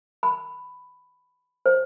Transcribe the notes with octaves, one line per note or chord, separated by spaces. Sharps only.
B5
C5